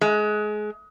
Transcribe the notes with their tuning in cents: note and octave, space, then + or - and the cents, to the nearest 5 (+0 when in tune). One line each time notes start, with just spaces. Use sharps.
G#3 +25